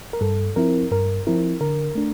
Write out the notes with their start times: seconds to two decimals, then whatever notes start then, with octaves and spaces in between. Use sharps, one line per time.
0.13 A#4
0.21 G2 A4
0.56 F3 C4 E4 A#4
0.91 G2 A#4
1.27 F3 C4 E4 A#4
1.61 D3 A#4
1.95 A3 D4